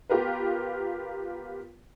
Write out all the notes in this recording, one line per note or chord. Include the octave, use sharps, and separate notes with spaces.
B3 F4 G4 A#4 B4